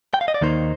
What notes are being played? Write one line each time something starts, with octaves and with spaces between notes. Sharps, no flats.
G5
F5
D#5
D5
D#2 D#3 A#3 D#4 C5